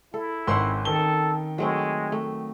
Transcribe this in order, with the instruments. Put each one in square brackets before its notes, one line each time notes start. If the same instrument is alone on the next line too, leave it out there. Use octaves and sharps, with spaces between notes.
[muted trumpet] E4 [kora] A4
[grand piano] G#1 C6 E6 [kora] C4 C#4 F#5
[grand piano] D#3 G7 [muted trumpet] A4
[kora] F#3 A3 C4 [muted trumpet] G#3
[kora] A3